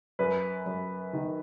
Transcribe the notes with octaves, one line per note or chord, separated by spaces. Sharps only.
F#2 B4
F#2
D#3